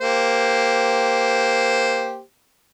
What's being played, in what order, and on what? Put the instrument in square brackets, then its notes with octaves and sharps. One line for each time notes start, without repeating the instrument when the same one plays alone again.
[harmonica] A#3 G4 C5